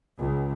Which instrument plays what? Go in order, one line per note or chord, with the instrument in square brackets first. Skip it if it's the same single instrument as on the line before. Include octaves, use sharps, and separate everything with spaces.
[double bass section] C#2